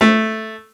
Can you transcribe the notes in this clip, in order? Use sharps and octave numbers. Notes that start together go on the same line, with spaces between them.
A3